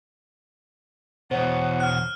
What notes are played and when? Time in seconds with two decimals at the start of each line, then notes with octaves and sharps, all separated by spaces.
1.31 E2 B2 C5 C#5 F#5
1.80 F6 F#6